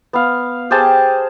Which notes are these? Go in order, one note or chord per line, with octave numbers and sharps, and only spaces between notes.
B3 F5
G4 G#4 C5 A5